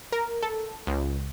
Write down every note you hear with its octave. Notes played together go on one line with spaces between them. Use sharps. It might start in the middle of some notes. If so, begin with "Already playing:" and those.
A#4
A4
C#2